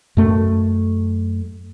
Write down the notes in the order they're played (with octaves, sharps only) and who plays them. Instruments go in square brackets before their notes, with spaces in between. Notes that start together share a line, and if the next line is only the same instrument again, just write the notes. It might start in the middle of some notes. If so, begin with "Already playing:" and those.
[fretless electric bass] F#2 A3